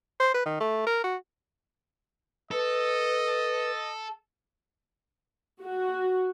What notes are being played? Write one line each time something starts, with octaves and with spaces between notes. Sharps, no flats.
C5
B4
D#3
A3
A#4
F#4
A4 B4 D#5
F#4